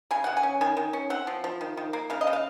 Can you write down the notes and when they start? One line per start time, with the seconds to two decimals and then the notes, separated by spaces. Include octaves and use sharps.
0.11 C#3 G#5
0.24 C#3 F#5
0.37 G#5
0.43 C#4
0.61 D#3 G#5
0.77 D#3
0.93 C#4
1.10 C4 F#5
1.27 F3
1.44 F3
1.61 D#3
1.77 D#3
1.93 A#3
2.10 C#3 F5
2.21 D#5
2.27 C#3
2.33 F5